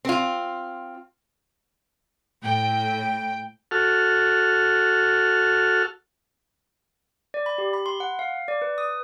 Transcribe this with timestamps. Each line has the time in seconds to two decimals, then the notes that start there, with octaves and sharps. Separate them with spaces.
0.05 C4 F4
2.43 A2 G5
3.71 F#4 A4 F6
7.34 D5
7.46 B5
7.58 G4
7.73 B5
7.86 C6
8.00 F#5
8.19 F5
8.48 D5
8.62 B4
8.78 D#6